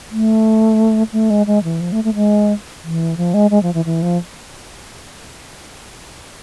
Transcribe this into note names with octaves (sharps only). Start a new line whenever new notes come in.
A3
A3
G#3
G#3
E3
F3
A3
A3
G#3
E3
F3
G#3
G#3
F3
E3
E3
F3